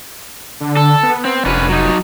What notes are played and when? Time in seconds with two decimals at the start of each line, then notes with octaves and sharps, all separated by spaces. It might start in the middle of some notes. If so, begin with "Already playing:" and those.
0.61 D3
0.77 A4
1.03 B3
1.25 C4
1.46 F1 D3 C#4 B4
1.69 F#3 D#4